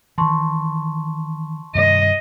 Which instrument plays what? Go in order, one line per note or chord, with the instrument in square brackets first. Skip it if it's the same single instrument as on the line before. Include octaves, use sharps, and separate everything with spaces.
[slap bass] D#3 E3 [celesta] A5 C6 C#6
[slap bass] G2 C3 D#3 [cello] D#5